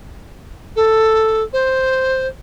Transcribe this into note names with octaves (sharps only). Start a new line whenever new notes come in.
A4
C5